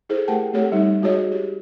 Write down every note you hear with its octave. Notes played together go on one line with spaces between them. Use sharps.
E4 G#4 A4 C5
A3 G4 A#4 F#5 G5 A5
A3 C4 G4 A4 C#5 F#5
G3 D#4
G#3 F#4 G#4 C#5 D#5
G4